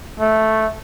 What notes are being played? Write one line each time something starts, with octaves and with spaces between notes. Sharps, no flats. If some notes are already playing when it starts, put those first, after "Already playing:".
A3